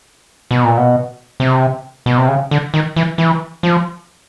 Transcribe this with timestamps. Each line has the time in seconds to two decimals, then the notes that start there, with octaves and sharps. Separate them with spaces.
0.51 B2
0.64 A#2
0.77 B2
1.40 C3
2.06 B2
2.18 C3
2.29 C#3
2.51 D3
2.74 D#3
2.96 E3
3.18 E3
3.63 F3